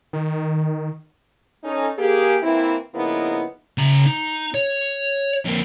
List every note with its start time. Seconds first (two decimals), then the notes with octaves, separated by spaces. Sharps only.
0.13 D#3
1.64 C#4 D#4 A4
1.99 A#3 G4 G#4
2.43 E3 A#3 C4 E4
2.95 C#3 F3 A#3 B3 D#4 E4
3.78 C#3 A#5
4.06 D#4
4.54 C#5
5.45 F2 A#3